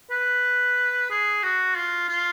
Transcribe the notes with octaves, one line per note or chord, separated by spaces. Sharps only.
B4
G#4
F#4
F4
F4